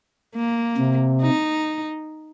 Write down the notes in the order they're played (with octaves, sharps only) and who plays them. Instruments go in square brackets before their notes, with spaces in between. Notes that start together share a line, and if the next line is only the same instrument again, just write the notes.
[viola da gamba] A#3
[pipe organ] C3
[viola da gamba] D#4